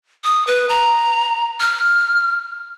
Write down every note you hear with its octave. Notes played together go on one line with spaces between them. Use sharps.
D#6
B4
A#5
F6